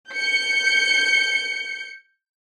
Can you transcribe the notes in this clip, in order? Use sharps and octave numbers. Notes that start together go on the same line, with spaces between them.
G6 C#7